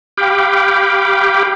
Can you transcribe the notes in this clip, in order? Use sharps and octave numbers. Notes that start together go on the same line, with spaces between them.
G4 F5 G5 B5 D6